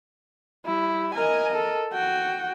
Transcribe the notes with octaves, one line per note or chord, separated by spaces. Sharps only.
G3 E4
A#4 D#5 G#5
A4
F#4 G5